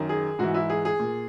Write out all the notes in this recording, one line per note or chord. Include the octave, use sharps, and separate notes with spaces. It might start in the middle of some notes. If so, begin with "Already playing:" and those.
Already playing: F#2 D#3
G#4
G#2 E3 F#4
E4
G#4
G#4
A#2